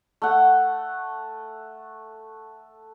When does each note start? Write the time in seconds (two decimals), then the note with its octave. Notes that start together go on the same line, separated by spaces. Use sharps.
0.22 A3 F#5